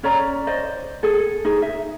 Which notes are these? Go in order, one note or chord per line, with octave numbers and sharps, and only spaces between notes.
C#4 C#5 D5 A#5
C5 D5 D#5
G#4 A4
D#4 G#4
E5